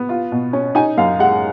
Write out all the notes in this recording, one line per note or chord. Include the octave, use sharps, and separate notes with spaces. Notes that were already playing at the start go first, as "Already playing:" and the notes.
Already playing: B3
F4
B2
C#4
D#4 G#5
F#2 F5
G#3 F#5